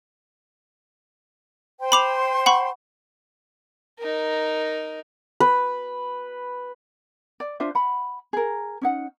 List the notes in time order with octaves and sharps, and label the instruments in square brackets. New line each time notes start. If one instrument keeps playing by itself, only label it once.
[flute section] C5 G5 C6
[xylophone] B5 D6 F7
F#5 B5 C#6
[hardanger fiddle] D#4 A#4
[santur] B4
[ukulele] D5
D4 F4 C5 E5
F#5 B5
G#4 A#4
C#4 D#4 F#5